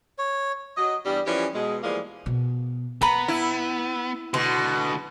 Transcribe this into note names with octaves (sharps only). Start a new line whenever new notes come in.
C#5
F#3 D#5
E2 G2 G3
E3 F3 G3 C#4 G4
B2 G#3
E3 F3 G3 G#3 A#3
B2
A#3 B3 A#5 B5
E4
B2 D3 F#4 C6